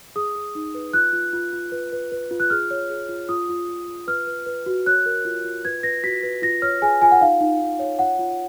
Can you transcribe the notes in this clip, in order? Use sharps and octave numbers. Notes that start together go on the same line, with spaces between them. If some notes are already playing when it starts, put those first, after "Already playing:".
G#4 D#6
G#4
D#4
B4
F4 F#6
F4
F4
F4
B4
B4
B4
F4
F#6
G#4 F6
C#5
G#4
F4
F4 D#6
F4
F4
F4
B4 F6
B4
B4
F#4
C#5 F#6
A#4
F4
F4
B4 G#6
B4 A#6
F#4 B6
B4
F4 A#6
C#5 F6
G#4 G#5
F4 G#5
F#5
D#4 F5
D#4
D#4
C#5
F4 F#5
F4